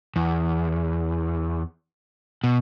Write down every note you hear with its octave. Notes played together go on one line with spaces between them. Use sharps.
E2
B2